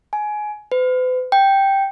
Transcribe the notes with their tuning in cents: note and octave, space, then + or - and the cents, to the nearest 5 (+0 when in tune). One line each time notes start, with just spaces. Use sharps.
G#5 +20
B4 +45
G5 +0